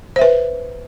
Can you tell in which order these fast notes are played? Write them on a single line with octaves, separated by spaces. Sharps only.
C5 E5 B4